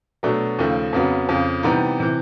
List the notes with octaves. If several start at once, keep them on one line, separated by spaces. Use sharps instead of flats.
B2 F#3 A3 D4
D#2 C#3 F3 A3
F2 C#3 F#3 B3
F2 C#3 F3
C3 E3 G3 B3 D#4
C3 E3